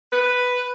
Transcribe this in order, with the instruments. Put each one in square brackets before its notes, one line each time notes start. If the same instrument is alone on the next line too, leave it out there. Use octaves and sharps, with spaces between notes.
[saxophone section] B4